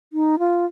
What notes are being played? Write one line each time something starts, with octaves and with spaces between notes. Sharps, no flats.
D#4
F4